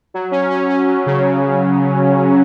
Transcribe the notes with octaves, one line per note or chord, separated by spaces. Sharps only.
F#3
C#4
C#4
C#4
F#3
C#3